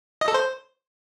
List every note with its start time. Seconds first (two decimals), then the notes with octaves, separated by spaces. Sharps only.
0.21 D#5
0.28 A4
0.34 C5